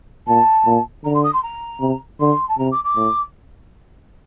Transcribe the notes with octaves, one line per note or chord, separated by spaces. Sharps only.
A#2 A5
A#2
D3 A#5
C6
D#6
C6
A#5
C3
D3 C6
A5
C3 A#5
D6
D6
A2